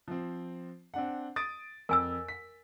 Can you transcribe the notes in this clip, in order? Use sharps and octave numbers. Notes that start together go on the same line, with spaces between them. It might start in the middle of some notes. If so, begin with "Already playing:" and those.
F3 C4
C4 D4 F#5
D#6 A6 D7
F2 A#4 G#5 E6
B6